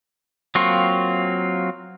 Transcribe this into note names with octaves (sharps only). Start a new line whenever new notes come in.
F#3 A#3 C4 F4 C#6